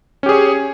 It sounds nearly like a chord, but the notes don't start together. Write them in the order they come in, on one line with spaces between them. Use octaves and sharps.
C#4 G4 G#4 C#5